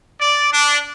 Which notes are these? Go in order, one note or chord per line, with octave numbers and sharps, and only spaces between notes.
D5
D4